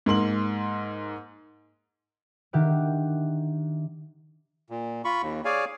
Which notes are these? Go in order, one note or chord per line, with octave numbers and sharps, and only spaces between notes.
G#2 A#3 C6 F#7
D#3 D4 G4 E5 F#5 D6
A#2
F4 B5 C#6
D#2
G#4 C#5 D5 F5 G#5